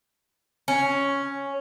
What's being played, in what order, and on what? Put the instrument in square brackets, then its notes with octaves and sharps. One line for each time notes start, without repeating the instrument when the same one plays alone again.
[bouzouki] C#4